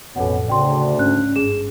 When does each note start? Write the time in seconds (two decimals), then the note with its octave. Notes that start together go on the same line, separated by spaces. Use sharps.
0.16 A1 F2 B2 C#4 A4 F#5
0.49 D2 C#3 D4 D5 G5 C6
0.99 G#2 C#4 F#6
1.36 G1 G#4 E7